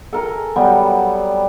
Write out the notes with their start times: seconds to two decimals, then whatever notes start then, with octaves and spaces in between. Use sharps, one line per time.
0.13 A4 A#4 G#5
0.56 F#3 G3 B3